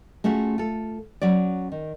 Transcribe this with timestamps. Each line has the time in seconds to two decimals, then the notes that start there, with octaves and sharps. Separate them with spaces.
0.24 A3 C#4 F4 F#4 G#4
0.58 F4 A4
1.22 F#3 C#4 D5
1.72 D#3